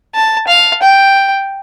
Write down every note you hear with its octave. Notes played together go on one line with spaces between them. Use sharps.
A5
F5
G5